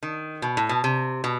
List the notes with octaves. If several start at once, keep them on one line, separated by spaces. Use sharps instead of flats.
D#3
B2
A2
B2
C3
B2